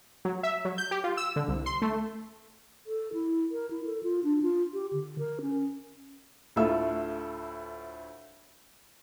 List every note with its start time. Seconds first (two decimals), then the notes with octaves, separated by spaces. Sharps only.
0.25 F#3
0.43 E5
0.65 F#3
0.78 G6
0.91 G4
1.04 F4
1.17 E6
1.36 D3
1.48 C2
1.66 C6
1.82 A3
2.87 A4
3.14 E4
3.51 A#4
3.71 E4
3.85 A4
4.03 F4
4.24 D4
4.42 F4
4.74 G4
4.93 D3
5.19 A#4
5.42 C#4
6.56 D2 A2 A3 F4 E5 E6